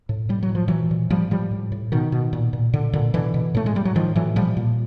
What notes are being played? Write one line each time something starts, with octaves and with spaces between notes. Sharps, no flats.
A2
A2 G3
F#3
A2
F3
A#2 E3 F#3
A#2
A2 F3 G3
A2 F3 G3
A2
A2
B2 D#3
B2
A#2
A#2
A#2 D3
A#2 D3
B2 D3 E3
B2
A2 A3
G#3
A2 G3
F#3
A2 D#3 F3
A2 E3 F#3
A#2 F3 G3
A#2